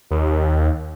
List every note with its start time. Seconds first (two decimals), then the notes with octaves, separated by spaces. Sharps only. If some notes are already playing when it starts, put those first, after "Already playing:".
0.11 D#2